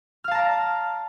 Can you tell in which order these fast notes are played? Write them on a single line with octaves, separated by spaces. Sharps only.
F6 F5 A5 A#5 D5